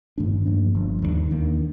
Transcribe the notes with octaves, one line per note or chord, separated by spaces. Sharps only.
G2 D#3 A3 D4
G2 F3 A#3 D4
G1 G2 F3
D#2 D#3 A3 D4
D#2 D#3 A#3 D4